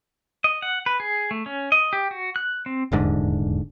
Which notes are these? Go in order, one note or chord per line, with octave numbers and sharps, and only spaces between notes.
D#5
F#5
B4
G#4
A3
C#4
D#5
G4
F#4
F#6
C4
D#1 E2 G#2 D3